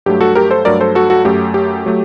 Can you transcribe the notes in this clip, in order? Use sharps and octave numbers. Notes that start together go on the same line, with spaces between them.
G2 F#3 A3 G4
F#4 A4
G4 A#4
A4 C5
G2 F#3 A3 A#4 D5
A4 C5
F#4 A4
F#4 A4
F#2 F#3 A3 G4
G4
F#3 A3